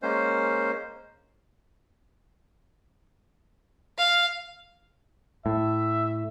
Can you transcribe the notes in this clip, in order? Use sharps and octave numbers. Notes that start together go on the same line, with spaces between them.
G#3 A#3 C#4 C5
F5
A2 E5